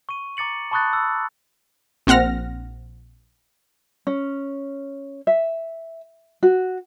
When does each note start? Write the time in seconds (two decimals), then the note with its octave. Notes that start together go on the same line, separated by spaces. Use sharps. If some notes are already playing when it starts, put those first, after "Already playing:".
0.09 C#6 D#7
0.37 A#5 D6 A6 C#7 F#7
0.71 A5 B5 C#6 D#6 F#6 A6
0.93 B5 E6
2.07 A#1 C4 F#5 F6 A#6
4.07 C#4
5.27 E5
6.43 F#4